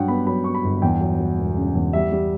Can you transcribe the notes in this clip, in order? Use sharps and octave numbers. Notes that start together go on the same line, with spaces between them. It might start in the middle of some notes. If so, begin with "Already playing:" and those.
Already playing: G2 F#3 F#5 G5
B3 B5
F#3 B5
B3 C#6
B5
G1
E2 G5
F#3
F#3
E1
C#3
E2
G3 E5
G3